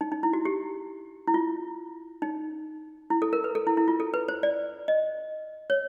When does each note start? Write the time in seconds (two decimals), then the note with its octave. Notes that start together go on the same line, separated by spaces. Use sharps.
0.01 D#4
0.12 D#4
0.23 E4
0.33 F#4
0.45 G4
1.27 E4
1.34 F4
2.22 D#4
3.10 E4
3.22 A4
3.33 A#4
3.44 B4
3.55 A4
3.67 E4
3.77 E4
3.88 F4
4.00 A4
4.14 B4
4.28 C5
4.43 D5
4.88 D#5
5.70 C#5